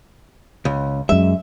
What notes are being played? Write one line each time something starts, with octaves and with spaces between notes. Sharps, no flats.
C#2
F#2 G#3 E5